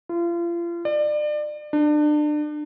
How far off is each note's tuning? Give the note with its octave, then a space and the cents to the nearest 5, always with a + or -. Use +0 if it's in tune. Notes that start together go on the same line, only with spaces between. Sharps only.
F4 -35
D5 +30
D4 +30